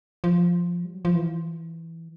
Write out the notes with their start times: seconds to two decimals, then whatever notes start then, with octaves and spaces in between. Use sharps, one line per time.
0.24 F3
0.85 G3
0.94 F#3
1.05 F3
1.15 E3